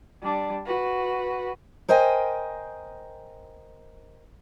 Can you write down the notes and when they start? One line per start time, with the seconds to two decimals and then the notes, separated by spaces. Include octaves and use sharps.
0.22 G3 D4
0.66 F#4 B4
1.88 A#4 C5 D#5 G5 G#5